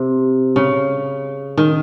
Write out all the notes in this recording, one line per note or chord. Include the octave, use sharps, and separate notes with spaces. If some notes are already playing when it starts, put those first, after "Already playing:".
Already playing: C3
C#3
D#3